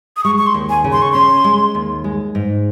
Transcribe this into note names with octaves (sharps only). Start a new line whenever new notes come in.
D#6
G#3 C#6
C#6
C6
D#2
G#5
C#3
C6
C#6
C#4 C6
G#3
D#2
G#3
G#2